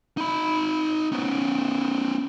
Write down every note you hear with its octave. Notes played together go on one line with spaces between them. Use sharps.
D#4 B5
B3 C#4